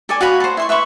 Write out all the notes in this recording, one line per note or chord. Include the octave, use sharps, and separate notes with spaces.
A4 D5 G#5
F#4 F5 G#5 B5
A4 C5
E4 C6 C#6
B4 E5 B5 C#6